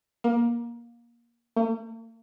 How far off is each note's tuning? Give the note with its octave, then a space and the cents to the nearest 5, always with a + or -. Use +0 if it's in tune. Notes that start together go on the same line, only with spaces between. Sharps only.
A#3 +20
A#3 -45